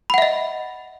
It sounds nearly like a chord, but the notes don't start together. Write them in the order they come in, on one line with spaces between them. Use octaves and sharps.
B5 F#5 E5 D#5